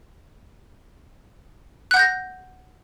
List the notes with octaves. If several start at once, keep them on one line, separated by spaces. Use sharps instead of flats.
F#5 F#6 G6 A#6